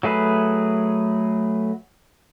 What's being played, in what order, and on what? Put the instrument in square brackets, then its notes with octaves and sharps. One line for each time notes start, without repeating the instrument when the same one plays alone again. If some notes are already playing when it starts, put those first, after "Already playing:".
[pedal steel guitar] F#3 A3 G#4 B4